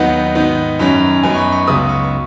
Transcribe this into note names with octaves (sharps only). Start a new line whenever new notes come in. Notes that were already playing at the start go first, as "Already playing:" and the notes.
Already playing: D#2 D#3 F#3 B3 D#4 F#5
G#2 D#3 B3 D#4
F#2 D#3 F#3 C#4 B5
F#2 F#3 B3 D#4 G#5
C#6
B5
C#6
C#2 C#3 F#3 B3 D#4 D#6
C#6
C#6